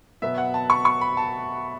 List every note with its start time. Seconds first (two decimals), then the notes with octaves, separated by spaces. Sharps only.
0.22 B2 F#3 B3 E5
0.38 F#5
0.54 A5
0.70 C#6
0.85 C#6
1.01 B5
1.17 A5